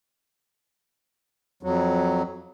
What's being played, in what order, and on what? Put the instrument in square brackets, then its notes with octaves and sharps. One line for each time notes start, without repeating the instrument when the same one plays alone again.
[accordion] F2 F#3